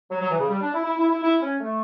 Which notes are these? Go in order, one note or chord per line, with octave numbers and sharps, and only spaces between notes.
F#3
F#3
E3
C#3
G3
D4
E4
E4
E4
E4
E4
C#4
A3